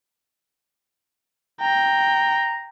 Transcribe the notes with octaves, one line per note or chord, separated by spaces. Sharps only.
G5 A#5